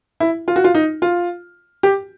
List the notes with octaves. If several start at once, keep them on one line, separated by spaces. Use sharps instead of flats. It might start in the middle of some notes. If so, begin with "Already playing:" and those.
E4
F4
F#4
F4
D#4
F4
G4